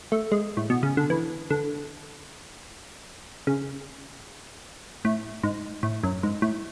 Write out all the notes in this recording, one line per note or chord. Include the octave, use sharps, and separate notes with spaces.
A3
G#3
A2
B2
C#3
D3
E3
D3
C#3
A2
G#2
A2
F#2
G#2
A2